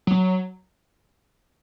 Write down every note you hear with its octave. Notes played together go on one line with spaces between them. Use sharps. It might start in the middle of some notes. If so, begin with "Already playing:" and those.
F#3